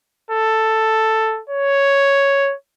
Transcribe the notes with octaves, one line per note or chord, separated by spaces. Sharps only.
A4
C#5